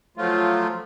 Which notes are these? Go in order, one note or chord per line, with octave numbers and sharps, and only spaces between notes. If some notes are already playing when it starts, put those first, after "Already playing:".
F3 F#3 A3 F4